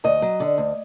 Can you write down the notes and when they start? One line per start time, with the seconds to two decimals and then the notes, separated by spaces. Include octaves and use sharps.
0.04 D2 D#5
0.22 F#3
0.40 D3
0.58 D2